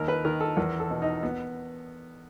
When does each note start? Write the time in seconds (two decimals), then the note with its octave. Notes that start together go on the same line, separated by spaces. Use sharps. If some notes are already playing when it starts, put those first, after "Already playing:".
Already playing: D#2 A#4
0.08 B4
0.25 D#3 A#4
0.41 A4
0.57 E2 A#4
0.80 A4
0.91 B2
1.02 D#4
1.23 B3